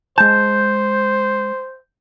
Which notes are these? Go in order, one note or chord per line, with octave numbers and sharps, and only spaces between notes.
G#3 C5 A5 G6